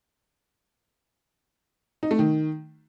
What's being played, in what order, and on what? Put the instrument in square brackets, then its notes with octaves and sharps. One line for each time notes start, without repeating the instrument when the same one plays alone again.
[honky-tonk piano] D#4
A3
D#3